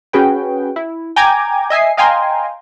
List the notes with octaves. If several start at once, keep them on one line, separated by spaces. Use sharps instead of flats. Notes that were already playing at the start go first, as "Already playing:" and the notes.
C#4 F#4 G#4 B4 G5
E4
G5 G#5 A#5 D6 G#6
D#5 E5 G#5 C7
D#5 F5 G5 G#5 A#5 C6